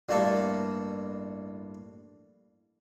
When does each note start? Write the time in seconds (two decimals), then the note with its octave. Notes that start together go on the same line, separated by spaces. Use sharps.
0.09 A1 G2 G3 A#3 A4